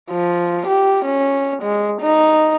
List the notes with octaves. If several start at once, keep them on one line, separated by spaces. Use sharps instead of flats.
F3
G4
C#4
G#3
D#4